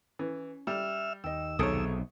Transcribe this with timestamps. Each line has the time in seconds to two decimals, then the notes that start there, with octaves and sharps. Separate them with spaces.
0.19 E3 C#4
0.67 G3 E5 E6 F6
1.24 D#2 D#5 G5 E6
1.59 B1 C3 D#4 G#4 A4 C#5 D#6